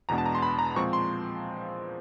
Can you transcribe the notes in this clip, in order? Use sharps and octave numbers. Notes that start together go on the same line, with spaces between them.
E2 B2 G#3 B3 D4 A#5
A5
A#5
C6
B5
A#5
A#2 F3 G#3 C4 C#6
C6